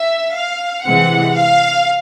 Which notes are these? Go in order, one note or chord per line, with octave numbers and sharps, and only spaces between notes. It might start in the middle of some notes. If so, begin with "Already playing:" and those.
Already playing: E5
F5
C3 E3 G#3 C4 F#5
F5